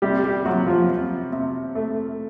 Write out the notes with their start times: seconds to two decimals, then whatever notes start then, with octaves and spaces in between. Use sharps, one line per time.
0.02 C3 G3 G4
0.24 G3 G4
0.45 C3 F#3 F#4
0.67 F3 F4
0.88 C3
1.32 C3
1.75 A3